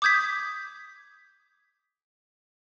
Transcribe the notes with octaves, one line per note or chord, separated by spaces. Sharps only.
D6 D#6 G6 G#6 B6